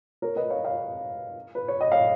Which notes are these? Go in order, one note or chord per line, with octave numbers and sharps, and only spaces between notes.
A#4 C#5
B4 D#5
C#5 F5
C#5 F5
B4
C#5
D#5
C#5 F5